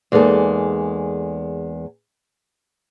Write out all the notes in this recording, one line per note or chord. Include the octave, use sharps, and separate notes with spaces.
E2 G#3 A#3 D#4 A4